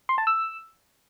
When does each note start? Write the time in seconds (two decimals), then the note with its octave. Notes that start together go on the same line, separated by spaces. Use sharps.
0.09 C6
0.18 A5
0.27 E6